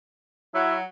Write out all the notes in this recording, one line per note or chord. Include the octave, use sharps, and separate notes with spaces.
F#3 E4